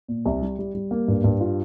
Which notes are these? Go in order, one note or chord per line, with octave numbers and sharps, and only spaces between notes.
A#2
C2
G3
G3
G3
A#3
G2
G2
F4